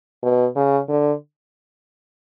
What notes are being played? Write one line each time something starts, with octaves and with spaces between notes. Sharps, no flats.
B2
C#3
D3